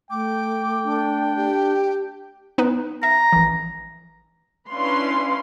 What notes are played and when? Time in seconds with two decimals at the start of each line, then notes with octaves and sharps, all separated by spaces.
0.11 A3 G5 D6
0.84 D4
1.36 G4
2.58 B3 D#4 B4
3.03 E5 A#5
3.33 A1 E3
4.70 C#4 D4 E4 B4 F5 C6